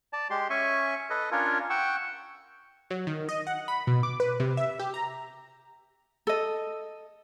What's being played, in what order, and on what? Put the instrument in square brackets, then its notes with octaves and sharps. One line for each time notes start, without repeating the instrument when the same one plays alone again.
[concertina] D5 A5
G#3 G4 C6
C#4 E5 G#5 C#6
A4 B4 D#5
C#4 D4 F4 A#4 C#5
F#5 G5 C#6 E6
[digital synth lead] F#3
D#3
D#5
F#5
B5
B2
D6
B4
C3
E5
G4
A#5
[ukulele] A4 D#5